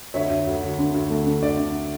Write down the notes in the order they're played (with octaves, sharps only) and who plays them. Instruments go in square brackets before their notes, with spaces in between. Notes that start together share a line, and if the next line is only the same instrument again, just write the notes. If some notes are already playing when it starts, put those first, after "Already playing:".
[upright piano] D2 C#5 E5
D2
D2
D2
D3
D2
A3
D3
D2 D5
D3